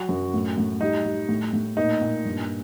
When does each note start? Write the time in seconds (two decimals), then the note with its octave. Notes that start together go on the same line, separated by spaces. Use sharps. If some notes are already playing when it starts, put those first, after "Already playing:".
Already playing: F#3 F#4
0.09 F#2
0.34 A2
0.58 A2
0.81 G3 D#4
1.05 G3
1.29 A2
1.53 A2
1.77 A#2 D#4
2.01 A#2
2.25 G2